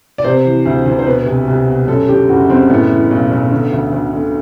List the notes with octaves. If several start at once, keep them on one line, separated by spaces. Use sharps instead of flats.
D5
C3 C5
E3
D2
D2
C5
B2 B4
C2
C2
B2
F#2 A4
D3 G4
F#1 F#4
F#1 C4
A2 B3
E3
B1
B1
D3
D2
D2
D3